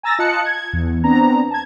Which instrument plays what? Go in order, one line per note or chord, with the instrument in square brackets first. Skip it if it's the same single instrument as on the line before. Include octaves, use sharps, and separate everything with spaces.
[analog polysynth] G#5 A#5 E6 A6 A#6
F4 D#5 A5 F#6 C#7
G#6
E2
B3 C4 D4 A#5
A5 G#6